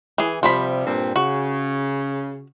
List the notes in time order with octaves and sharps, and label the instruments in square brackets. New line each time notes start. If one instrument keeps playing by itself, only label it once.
[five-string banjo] E3 G#4
[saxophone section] C3 [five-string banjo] F3 G3 B5
[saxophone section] G2 A#2 C4
[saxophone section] C#3 [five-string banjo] F#4